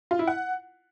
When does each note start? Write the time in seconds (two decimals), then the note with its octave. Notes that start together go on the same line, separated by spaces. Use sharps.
0.11 F4
0.19 E4
0.27 F#5